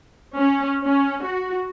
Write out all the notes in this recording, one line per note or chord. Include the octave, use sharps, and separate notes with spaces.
C#4
C#4
F#4